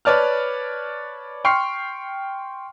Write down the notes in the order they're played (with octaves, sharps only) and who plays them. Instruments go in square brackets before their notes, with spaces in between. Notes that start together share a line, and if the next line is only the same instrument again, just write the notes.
[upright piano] B4 C#5 D5 A5 F6
G5 C6 C#6 F6 C7